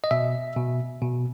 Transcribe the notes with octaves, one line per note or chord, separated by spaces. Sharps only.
D#5
B2 E5
B2
B2